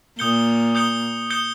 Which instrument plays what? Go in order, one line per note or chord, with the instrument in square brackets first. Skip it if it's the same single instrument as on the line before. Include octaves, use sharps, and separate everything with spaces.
[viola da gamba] A#2 [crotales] D#6 G6 C#7 G7
[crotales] D#6 G6 C#7 G7
D#6 G6 C#7 G7